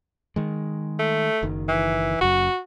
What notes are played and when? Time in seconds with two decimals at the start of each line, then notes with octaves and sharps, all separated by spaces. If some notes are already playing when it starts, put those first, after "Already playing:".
0.36 D#3 G#3
0.99 A3
1.43 F#1 D#3
1.68 E3
2.21 F#1 F#2 F#4